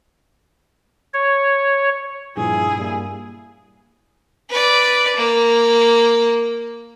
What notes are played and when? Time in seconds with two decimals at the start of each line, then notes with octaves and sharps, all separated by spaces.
1.14 C#5
2.37 G2 A#2 F3 E4 G#4
2.77 G2 G3 A#3
4.49 B4 D5
5.16 A#3